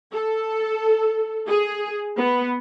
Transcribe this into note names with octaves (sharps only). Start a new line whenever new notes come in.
A4
G#4
B3